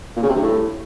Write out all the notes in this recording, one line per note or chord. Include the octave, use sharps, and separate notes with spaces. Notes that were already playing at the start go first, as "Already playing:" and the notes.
A#2
C#3
C3
G2
A2